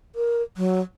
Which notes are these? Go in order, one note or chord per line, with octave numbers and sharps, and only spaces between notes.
A#4
F#3